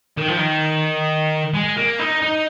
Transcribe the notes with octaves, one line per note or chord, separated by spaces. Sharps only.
D#3
F3
D#3
G#3
A#3
D#4
D#4